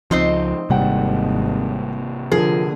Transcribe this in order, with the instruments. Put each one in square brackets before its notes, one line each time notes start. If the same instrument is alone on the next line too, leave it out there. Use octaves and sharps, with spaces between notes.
[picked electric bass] C#2 F3 [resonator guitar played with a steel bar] C4 D#4 C5
[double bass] G#1 [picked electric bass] C3 A#3 [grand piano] G3 F#5 G5
[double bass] D3 [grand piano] F3 A#4 [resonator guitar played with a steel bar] G#4